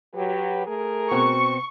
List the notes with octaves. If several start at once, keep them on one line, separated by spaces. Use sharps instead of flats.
F#3 G4 B4
A3 G#4 A#4
B2 C4 F#4 C#6